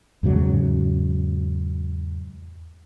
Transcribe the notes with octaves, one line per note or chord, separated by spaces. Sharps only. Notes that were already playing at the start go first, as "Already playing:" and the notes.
E2 G#2 C#3 F#3